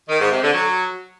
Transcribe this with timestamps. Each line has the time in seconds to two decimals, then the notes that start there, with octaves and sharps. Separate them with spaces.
0.09 D#3
0.20 G#2
0.31 C3
0.42 D3
0.53 F#3